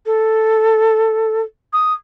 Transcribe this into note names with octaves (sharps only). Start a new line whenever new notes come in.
A4
D#6